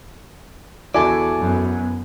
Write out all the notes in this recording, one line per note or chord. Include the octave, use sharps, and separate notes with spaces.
E2 E4 F#4 A4 D5 G#5
F#2 B3